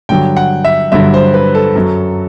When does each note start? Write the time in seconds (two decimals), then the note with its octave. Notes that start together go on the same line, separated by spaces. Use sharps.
0.09 G2 D3 F#3 G5
0.37 F#5
0.65 E5
0.92 G2 D3 F#3 E5
1.14 C5
1.34 B4
1.55 A4
1.75 F#2 F#3